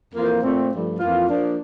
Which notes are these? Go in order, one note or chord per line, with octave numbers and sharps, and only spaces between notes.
F2 E3 A#3 F4 C5
A#2 A3 C4
G2 F3 A3
F2 E3 A#3 F4
F3 A#3 D4